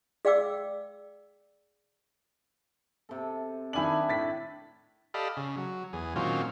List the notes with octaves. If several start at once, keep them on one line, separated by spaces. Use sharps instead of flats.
G#4 D5 F5 G5 D6 E6
C3 A4
D#3 D4 E4 G#5 F#7
A2 A6 B6
G4 A4 D5 D#5 F5 B5
C#3
F#3
E2 G#4
A#2 D#3 F#3 C4 C#4 F4